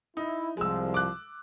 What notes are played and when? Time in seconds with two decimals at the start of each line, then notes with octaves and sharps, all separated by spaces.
0.17 D#4 E4
0.57 C2 F3 G#3 E6
0.94 D6 F#6